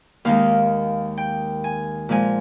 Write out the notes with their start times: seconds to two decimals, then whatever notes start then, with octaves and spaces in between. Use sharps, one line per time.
0.25 D#2 D#3 G#3 F5
1.18 G5
1.64 G#5
2.09 A#2 F3 G#3 G#5